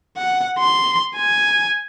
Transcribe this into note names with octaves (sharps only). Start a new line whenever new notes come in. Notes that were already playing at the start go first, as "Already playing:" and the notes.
F#5
C6
G#5